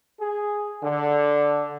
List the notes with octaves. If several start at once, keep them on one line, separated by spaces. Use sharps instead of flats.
G#4
D3